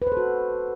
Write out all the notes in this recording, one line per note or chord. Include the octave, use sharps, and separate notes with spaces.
B4
C5
A4
F#4